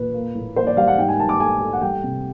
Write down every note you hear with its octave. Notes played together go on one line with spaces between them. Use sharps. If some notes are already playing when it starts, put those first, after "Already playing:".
Already playing: A#2 B4
A#3
A2
A#3 C5
D5
G3 F5
F#5
G#2 G5
G#5
G#2 A5
D6
A3 G#5
A3
F#5
G3 G5
C3